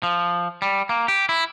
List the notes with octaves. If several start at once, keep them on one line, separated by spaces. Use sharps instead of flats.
F3
G3
A#3
G4
E4